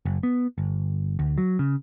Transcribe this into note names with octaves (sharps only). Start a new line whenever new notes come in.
F#1
B3
G1
D2
F#3
C#3